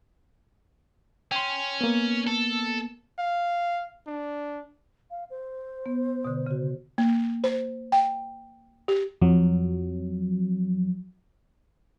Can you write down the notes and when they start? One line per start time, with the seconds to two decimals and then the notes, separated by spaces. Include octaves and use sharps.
1.31 C#4 G5 C6
1.81 A#3 B3
2.27 A4
3.19 F5
4.07 D4
5.11 F5
5.30 C5
5.86 B3
6.25 B2 D3
6.46 C#3 F#4
6.98 A#3
7.44 C5
7.92 G5
8.88 G4
9.22 F2 F#3